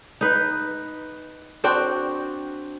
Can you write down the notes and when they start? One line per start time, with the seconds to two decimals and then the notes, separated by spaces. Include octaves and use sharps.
0.21 D#4 B4
1.64 C4 D4 F#4 G5